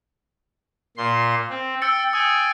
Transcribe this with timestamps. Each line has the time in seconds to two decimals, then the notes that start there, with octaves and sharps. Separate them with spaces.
0.97 A#2 C6
1.50 C4
1.82 G5 E6 A6 C#7
2.13 G5 G#5 D#6